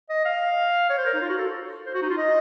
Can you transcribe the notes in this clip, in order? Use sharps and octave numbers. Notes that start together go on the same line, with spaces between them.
D#5
F5
C#5
C5
A#4
D#4
F4
F#4
A4
C5
F#4
D#4
F4
D#5